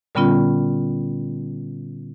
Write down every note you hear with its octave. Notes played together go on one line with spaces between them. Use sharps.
A#2 D3 G3 B3 C#4 F4